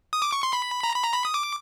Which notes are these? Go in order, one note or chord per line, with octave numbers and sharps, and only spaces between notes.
D#6
D6
C#6
C6
B5
A#5
B5
A#5
B5
D#6
D6